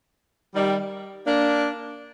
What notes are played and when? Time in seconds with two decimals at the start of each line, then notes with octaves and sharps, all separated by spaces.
0.54 D#3 G3
1.25 A#3 D4